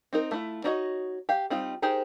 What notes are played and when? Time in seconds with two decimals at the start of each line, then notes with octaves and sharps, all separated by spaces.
0.13 C4 D#4 A#4
0.31 A3 E4 F4
0.64 D4 D#4 F#4 C#5 D#5
1.29 G4 F5
1.50 G3 C4 D#4 F4
1.82 D#4 G4 G#4 A#4 C5